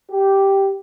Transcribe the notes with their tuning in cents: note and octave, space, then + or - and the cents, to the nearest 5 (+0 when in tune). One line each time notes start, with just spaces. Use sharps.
G4 -5